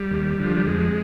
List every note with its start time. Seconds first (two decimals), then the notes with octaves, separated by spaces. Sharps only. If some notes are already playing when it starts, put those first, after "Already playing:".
Already playing: G3
0.11 D#2
0.39 D3 F3
0.56 G3
0.67 F2 G#3